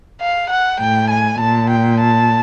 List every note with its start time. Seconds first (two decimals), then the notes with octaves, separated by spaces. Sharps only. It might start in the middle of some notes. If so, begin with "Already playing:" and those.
0.21 F5
0.50 F#5
0.80 A2 G5
1.10 G#5
1.40 A#2 A5
1.70 G5
2.01 A5